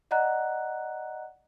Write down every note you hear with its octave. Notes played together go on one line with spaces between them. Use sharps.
D5 D#5 F#5 A#5 F#6